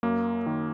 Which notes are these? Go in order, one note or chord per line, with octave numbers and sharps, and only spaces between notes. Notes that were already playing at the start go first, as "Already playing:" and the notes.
F#2 A#3
D#3